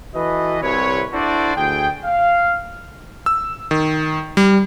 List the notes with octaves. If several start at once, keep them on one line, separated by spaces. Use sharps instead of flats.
E3 F#4 A4 B4 D#5
C2 C3 E4 B4 C#5
D4 E4 F#4 A4 C5 D5
D2 G#4 G5
F5
E6
D#3
G3